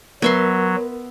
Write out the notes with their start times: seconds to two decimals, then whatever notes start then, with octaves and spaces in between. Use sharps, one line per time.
0.22 F#3 B3 A#4 E5 C6